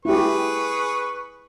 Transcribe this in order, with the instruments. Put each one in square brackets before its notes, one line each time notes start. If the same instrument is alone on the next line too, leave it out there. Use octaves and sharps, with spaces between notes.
[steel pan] E4 G4 [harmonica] G#4 B4 C#6